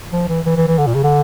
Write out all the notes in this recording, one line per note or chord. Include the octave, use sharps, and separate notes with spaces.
F3
E3
E3
E3
E3
D3
A#2
C#3
D3